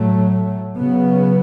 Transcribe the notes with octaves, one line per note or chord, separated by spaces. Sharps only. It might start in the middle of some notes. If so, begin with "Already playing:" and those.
Already playing: A2 F#3 A3
C#3 F#3 B3